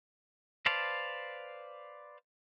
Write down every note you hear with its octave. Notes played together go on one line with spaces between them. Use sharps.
B4 C5 D5 F5 A5